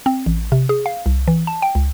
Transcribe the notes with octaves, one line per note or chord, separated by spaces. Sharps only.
C4
A1
C3
G#4
F5
C2
E3
A5
G5
C#2